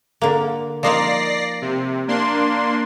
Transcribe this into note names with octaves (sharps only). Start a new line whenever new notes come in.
D3 A#3
F3 A#3 D#4 D5 A#6 C7
C3
A#3 D4 C6